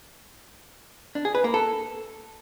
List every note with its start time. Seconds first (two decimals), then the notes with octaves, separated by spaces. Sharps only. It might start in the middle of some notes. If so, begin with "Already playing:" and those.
1.15 D4
1.25 G#4
1.35 B4
1.44 A#3
1.54 A4